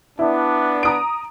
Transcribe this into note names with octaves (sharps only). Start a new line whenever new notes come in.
B3 D4 E4
A#5 D#6 D7